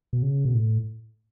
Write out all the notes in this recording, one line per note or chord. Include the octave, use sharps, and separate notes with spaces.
B2
C#3
B2
A2